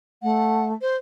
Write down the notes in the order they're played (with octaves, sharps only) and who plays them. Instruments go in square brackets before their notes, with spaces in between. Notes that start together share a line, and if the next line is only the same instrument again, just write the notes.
[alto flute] A3 [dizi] F#5
[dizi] C5